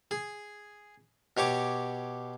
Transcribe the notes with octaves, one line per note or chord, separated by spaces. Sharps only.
G#4
B2 G4 C#5 D6